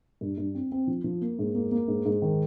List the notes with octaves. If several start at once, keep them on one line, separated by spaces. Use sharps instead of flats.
G2
G2
C4
C4
F3
F3
A#3
G#2
A#3
A#3
G#2
G#2
D#3